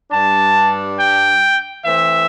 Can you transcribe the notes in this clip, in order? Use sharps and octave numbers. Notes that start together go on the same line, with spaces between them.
G2 G3 D4 A5
G5
E3 A3 C4 E5